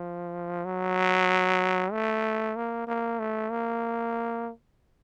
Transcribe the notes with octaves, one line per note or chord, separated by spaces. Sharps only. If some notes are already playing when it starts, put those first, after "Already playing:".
Already playing: F3
F#3
A3
A#3
A#3
A3
A#3